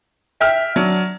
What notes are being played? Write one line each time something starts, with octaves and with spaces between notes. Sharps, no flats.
E5 G5 F6
F#3 D4